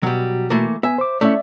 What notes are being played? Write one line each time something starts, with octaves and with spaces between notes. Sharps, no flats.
B2 F#3 G3 F#4
E3 A3 A#3
B3 E5 G#5
C5 D6
A3 C#4 E4 D5 E5